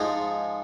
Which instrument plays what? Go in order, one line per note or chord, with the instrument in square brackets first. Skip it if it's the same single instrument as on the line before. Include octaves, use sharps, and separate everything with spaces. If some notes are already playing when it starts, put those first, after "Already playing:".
Already playing: [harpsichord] G#2 F3 G#3 D#4